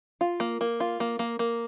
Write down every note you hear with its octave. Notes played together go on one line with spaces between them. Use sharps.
F4
A#3
A#3
F4
A#3
A#3
A#3